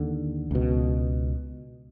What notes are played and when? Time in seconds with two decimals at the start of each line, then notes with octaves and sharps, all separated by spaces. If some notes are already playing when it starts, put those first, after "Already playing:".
Already playing: D#2 D3
0.51 C#2 B2